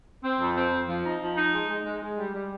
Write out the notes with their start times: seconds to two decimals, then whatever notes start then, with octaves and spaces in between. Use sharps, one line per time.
0.23 C4
0.39 F2
0.55 C4
0.72 F2
0.87 F3
1.04 D#4
1.20 F3
1.36 D#4
1.52 G#3
1.68 G#3
1.84 G#3
2.01 G#3
2.17 G3
2.33 G3